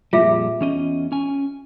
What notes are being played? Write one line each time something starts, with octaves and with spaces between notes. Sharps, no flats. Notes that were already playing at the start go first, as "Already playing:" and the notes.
F2 A#2 G3 F4 G#4 E5
E2 C#4 D#5
C#4 G#5